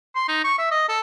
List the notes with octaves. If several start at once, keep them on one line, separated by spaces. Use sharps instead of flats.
C6
D#4
C#6
E5
D#5
A4